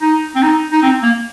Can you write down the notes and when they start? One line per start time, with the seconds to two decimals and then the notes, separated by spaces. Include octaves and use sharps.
0.02 D#4
0.36 C4
0.43 D#4
0.72 D#4
0.83 C4
1.03 A#3